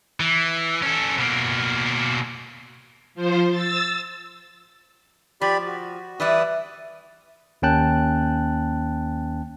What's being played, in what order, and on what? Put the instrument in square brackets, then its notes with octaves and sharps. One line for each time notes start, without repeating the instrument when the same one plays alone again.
[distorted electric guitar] E3
C#4 A4
B2 A#3
[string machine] F3 C5
E6 A6
[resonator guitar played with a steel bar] F3 [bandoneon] G4 D5 B5
[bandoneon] F#4
[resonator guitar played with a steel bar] E3 G3 E4 [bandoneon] B4 D5 D#6
[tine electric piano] D#2 A#3 C#4 G5 A5 F#6